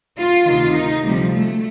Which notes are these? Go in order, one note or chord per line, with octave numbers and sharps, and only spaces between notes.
F4
D2 C3 D#3 F4
D#4
D2 C3 F3 G3
A3